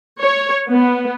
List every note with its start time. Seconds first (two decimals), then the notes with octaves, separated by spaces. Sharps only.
0.19 C#5
0.69 B3